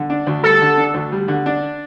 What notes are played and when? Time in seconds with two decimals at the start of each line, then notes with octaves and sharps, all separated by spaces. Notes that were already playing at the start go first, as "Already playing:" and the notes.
Already playing: D3
0.10 D4
0.27 D2
0.44 G3 A4
0.62 D3
0.77 D4
0.94 D2
1.12 G3
1.28 D3
1.46 D4